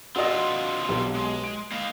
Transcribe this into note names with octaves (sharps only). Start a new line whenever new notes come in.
C4 D4 F4 F#4 D#5
B1 B3 G4
G#3
D7
A#3 D#5 F5